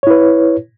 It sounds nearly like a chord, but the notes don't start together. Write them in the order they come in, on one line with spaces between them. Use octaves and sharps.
C#5 E4 B4